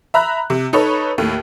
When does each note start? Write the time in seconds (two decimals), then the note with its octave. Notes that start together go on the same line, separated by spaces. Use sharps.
0.14 E5 A#5 B5 F#6
0.50 C3
0.73 D#4 A4 B4 C#5
1.18 D#2 A2